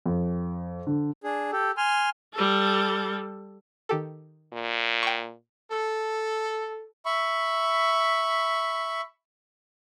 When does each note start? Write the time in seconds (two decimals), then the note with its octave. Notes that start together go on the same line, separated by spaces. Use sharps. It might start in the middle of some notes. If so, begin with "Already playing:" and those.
0.06 F2
0.87 D3
1.23 D4 G#4
1.52 G4 A4
1.77 G#5 C6 F6
2.34 G3 A4
3.89 D#3 G4 A4
4.53 A#2
5.03 G5 C#6
5.71 A4
7.06 E5 B5 C#6